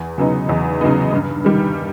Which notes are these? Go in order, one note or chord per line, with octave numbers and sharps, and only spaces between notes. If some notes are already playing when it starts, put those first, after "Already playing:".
Already playing: E2
C#3 F#3 B3 D#4
E2
C#3 F#3 B3 D#4
G2
D#3 G3